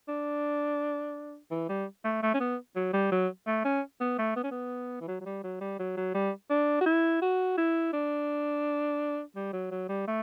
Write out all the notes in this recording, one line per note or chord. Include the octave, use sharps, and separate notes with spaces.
D4
E3
G3
A3
A3
C#4
B3
F#3
G3
F#3
A3
C#4
B3
A3
B3
C#4
B3
E3
F#3
F#3
G3
F#3
G3
F#3
F#3
G3
D4
F#4
E4
F#4
E4
D4
G3
F#3
F#3
G3
A3